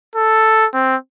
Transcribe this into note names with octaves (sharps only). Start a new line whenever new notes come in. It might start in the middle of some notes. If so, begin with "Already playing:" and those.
A4
C4